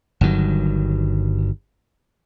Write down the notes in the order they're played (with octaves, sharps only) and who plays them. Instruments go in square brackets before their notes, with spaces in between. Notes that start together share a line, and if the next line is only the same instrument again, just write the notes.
[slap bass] G1 G2 D#3 F#3